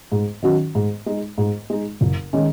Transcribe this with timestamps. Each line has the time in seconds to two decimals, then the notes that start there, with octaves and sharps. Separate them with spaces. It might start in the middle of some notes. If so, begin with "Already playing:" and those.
0.12 G#2
0.43 D#3 F#3 C#4 F#4
0.75 G#2
1.06 G#3 D#4
1.38 G#2
1.70 G#3 D#4
2.01 F#1
2.33 D#3 G#3 C#4